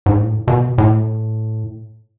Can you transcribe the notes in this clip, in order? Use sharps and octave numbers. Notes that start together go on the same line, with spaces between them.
G#2
A2
B2
A2